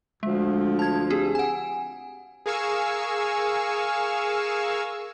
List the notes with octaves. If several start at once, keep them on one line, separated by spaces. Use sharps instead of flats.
D2 F3 G#3
A5 G#6
C4 G4 G#4
F#5 G#5
G#4 A#4 F5 G#5 C#6 E6